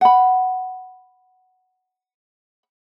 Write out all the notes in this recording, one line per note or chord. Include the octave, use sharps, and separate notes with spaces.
F#5 B5